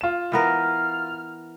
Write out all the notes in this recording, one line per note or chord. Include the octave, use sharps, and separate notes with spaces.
F4 E7
E3 B3 A#4 F6